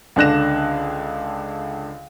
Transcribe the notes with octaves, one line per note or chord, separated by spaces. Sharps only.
C#2 D3 D4 F#6 A#6 E7